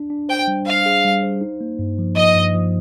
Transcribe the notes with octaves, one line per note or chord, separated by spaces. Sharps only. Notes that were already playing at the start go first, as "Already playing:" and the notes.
Already playing: D4
D4
C5 G5
G3
C5 F5
G#4
G3
C5
D#4
A#3
G2
F3
F3 D#5
G2
F3